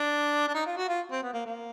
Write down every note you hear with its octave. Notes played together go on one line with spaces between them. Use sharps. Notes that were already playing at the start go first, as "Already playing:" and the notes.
Already playing: D4
D4
D#4
F4
F#4
F4
C4
B3
A#3
A#3